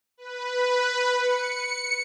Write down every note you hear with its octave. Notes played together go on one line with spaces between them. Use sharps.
B4
C#7